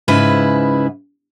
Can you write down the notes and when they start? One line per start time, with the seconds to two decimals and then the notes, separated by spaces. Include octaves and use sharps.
0.08 G#2 C#3 E4 B4